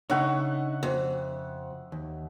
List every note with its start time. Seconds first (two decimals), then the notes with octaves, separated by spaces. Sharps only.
0.10 C#3 D4 D#4 C#5 E5 F#5 C#6
0.83 F2
1.92 D#2